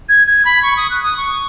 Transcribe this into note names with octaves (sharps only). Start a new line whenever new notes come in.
G#6
G#6
B5
C#6
D#6
F#6
D#6
C#6